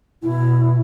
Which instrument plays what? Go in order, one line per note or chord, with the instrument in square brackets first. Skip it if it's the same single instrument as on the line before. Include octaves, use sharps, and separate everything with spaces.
[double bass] B2 [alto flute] E4